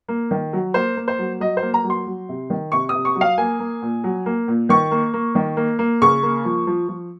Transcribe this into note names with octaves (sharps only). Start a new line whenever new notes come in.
A#3
D#3
F#3
A#3 C5
A#3
C5
F#3
F#3 D#5
C5
A#3
A#5
F#3
C6
F#3
C3
D#3
C3 C#6
D#6
C3
C#6
F#3
F5
A#3 G#5
A#3
A#2
F#3
A#3
A#2
D#3 C#6
A#3
A#3
D#3
A#3
A#3
C#3 C#6
A#3
F3
F3
F3